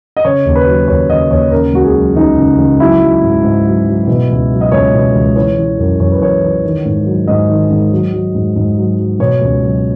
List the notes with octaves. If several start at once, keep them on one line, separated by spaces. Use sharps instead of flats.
D#5
C#3 C#5
D#2
B4
F#3
D#2 C#5
C#3 D#5
D#2 C#5
C#3 A#4
C#2 F#4
G#4
F#3
C#2 D#4
C#3
C#2
F#3 E4
F#3
G#2
G#2
F#3
F#3
B2
C#2
F#3
D#5
C#2 C#5
B2
C#2
E3 C#5
E3
F#2
F#2 C#5
B4
E3 C#5
E3
D#3
G#2
F#3
G#2 D#5
D#3
G#2
F#3
F#3
G#2
G#2
F#3
F#3
B2 C#5
C#2
F#3